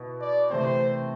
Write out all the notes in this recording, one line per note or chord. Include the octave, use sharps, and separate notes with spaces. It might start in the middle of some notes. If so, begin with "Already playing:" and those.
Already playing: B2 E4
D5
C3 E3 A3 C4 C5